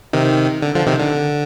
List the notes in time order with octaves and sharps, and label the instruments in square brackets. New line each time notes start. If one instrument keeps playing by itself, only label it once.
[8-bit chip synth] C3 D#3
D3
D3 F3
C3 D#3
D3